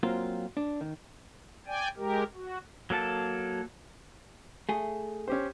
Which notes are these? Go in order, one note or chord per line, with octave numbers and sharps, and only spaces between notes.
F#3 A#3 C4 F4
D4
D#3
D5 G5 G#5
G#3 G4 A#4
F#4
F#3 A#3 A4 A5
A3 G#4
C#4 G4 C5